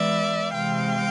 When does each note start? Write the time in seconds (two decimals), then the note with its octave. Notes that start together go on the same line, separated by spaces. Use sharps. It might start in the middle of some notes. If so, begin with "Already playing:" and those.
Already playing: E3 G#3 B3 D5 E5
0.53 C3 E3 G#3 C4 F5 G5